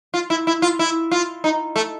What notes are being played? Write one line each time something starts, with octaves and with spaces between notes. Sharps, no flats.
F4
E4
E4
F4
E4
F4
D#4
A3